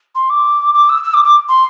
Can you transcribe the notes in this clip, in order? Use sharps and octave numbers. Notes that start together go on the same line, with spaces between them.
C6
D6
D6
E6
E6
D6
D6
C6